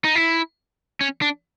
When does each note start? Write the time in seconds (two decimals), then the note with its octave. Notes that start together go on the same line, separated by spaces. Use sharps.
0.04 D#4
0.15 E4
1.01 C#4
1.22 D4